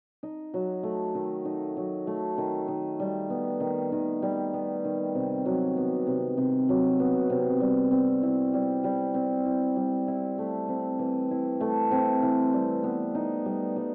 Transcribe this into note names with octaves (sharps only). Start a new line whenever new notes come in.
D#4
F#3
A3
D#3
D#4
F#3
A3
D#3
D#3
G3
B3
D#3
D#3
G3
B3
D#3
C3
F#3
B3
C3
C3
F#3
B3
C3
G3
C4
E4
G3
G3
C4
E4
G3
E4
A3
C4
E3
E4
A3
C4
E3
G3
B3
D#4
G3
G3